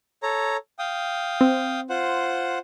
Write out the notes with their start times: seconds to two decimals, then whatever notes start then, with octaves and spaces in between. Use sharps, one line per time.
0.23 A4 C#5 A#5
0.79 F5 G5 D#6
1.41 C4
1.90 F4 C5 F#5